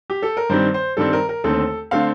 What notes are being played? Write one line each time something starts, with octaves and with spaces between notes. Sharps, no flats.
G4
A4
A#4
G2 D#3 G3 C4 C5
C5
G2 D#3 G3 C4 A4
A#4
A#4
D#2 D3 A3 C4 A4
D3 A3 C4 F5